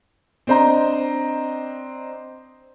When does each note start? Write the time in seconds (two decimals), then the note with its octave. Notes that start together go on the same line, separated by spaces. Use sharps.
0.47 C4 D4 C5 D#5 A#5